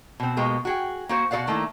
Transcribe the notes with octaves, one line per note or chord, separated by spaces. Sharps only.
B2 C4
B2 G#3 A#3 G4
F#4 G#4 G5
A#3 F#4 C5
B2 F#4 A4 D5 F5 F#5
D#3 A3 A#3 D4 E4